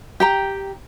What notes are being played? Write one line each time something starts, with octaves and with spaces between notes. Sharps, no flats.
G4 G5 A#5